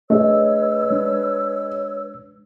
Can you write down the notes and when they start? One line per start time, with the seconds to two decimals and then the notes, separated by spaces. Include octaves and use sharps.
0.10 A3 D4 G#4 B4 C#5 D#5 E6
0.90 G#3 D4